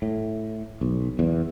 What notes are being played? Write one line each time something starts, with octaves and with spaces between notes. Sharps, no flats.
A2
B1
E2